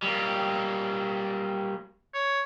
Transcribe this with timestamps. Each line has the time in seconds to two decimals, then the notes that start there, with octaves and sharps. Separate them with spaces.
0.02 G3 A#3
2.14 C#5